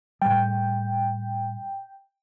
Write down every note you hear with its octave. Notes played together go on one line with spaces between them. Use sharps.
A2 G3 G5